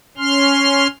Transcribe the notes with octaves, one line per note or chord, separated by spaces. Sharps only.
C#4 C6 F6